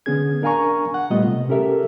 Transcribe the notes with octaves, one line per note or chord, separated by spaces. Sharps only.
D3 B3 C#4 G#4 G#6
D4 A#4 F5 G#5 A#5 C#6
F#5
A#2 G3 A3 B3 F4 D#5
C3
C#4 G4 A4 A#4 E5